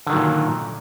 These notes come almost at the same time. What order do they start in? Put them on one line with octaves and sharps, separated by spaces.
D3 D#3 F#3 A#2